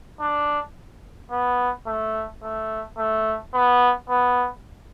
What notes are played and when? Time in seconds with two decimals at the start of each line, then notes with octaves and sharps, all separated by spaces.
0.21 D4
1.31 B3
1.87 A3
2.43 A3
2.98 A3
3.54 B3
4.10 B3